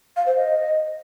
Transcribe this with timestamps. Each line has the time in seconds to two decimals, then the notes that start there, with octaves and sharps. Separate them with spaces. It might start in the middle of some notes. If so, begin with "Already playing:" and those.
0.17 F5
0.26 C5
0.36 D#5